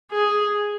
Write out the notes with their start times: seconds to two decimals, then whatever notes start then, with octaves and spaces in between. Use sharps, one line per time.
0.12 G#4